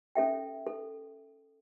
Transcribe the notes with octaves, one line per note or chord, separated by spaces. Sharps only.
C#4 A4 E5 G5
A4